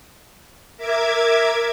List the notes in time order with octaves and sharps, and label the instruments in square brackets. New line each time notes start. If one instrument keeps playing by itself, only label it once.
[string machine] A#4 E5 D6 G#6